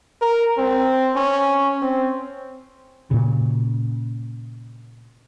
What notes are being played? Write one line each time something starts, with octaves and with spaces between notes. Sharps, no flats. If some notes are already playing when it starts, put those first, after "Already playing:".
A#4
C4
C#4
C4
A#2 C#3